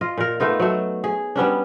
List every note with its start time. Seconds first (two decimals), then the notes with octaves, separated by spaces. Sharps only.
0.01 F4 D#5
0.18 A#2 A#4
0.40 A3 B3 D#4 F4
0.60 F#3 A3
1.04 G#4
1.36 G3 B3 C#4 D4